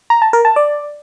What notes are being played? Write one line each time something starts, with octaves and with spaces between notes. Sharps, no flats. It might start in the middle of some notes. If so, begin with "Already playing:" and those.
A#5
A5
A#4
A5
D5